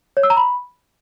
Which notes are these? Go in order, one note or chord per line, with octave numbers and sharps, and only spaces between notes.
C#5
E6
A#5
B5